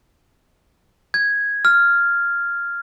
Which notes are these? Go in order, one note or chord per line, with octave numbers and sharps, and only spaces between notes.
G#6
F6